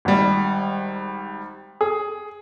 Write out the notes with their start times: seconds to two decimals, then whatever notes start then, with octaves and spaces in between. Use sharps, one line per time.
0.05 G#1 G3
1.81 G#4